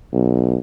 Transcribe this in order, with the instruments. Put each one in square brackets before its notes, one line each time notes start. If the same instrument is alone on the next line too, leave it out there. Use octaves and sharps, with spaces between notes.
[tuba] B1